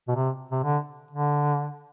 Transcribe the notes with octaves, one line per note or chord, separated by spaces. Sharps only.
B2
C3
C3
D3
D3